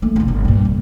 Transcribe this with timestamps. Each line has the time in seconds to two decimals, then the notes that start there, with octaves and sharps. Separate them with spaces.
0.02 A3 A#3
0.16 C2 F4
0.28 G1
0.45 G2 A#2
0.65 F1